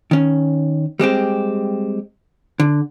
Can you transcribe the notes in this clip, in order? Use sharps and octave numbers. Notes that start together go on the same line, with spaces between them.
D#3 C#4
G3 G#3 C4 G4
D3